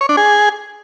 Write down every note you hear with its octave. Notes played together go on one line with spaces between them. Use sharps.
C#5
D4
G#4